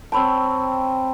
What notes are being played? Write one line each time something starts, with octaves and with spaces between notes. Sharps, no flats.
C4 C#5 G5 A5 B5 E6